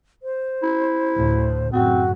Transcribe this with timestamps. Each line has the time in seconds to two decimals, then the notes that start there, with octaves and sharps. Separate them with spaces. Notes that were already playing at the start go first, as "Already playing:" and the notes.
0.23 C5
0.63 E4
1.16 D2 A2
1.73 F#2 A2 C#3 C4 F#4